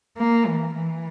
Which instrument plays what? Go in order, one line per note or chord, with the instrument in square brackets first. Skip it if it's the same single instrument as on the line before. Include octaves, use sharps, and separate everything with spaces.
[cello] A#3
E3
E3